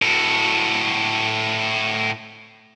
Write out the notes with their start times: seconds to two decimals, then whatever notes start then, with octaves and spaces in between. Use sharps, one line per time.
0.02 A2 F#4